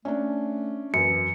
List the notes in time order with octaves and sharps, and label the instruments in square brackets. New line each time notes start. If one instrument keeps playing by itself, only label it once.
[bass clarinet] A3 [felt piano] C#4 D4
[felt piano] F#2 [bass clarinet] E3 [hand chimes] C#7